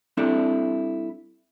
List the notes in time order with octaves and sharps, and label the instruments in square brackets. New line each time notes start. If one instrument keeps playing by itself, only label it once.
[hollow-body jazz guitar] G3 C4 D4 E4 A4